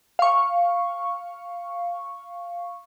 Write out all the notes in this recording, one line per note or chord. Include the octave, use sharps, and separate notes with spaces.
F5 C#6